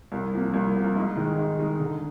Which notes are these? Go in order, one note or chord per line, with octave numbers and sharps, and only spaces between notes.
C2
C3 F3 A#3
C2
C3 F3 A#3
G#2
D#3 G#3 D#4
G#2
D#3 G#3 D#4
D3